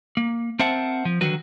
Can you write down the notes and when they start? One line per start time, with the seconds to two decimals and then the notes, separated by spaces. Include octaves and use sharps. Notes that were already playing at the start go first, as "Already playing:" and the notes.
0.17 A#3
0.59 C4 A#4 C5 E5 F#5 A5
1.05 F3
1.21 D3 D#3 F#3 F#4 B4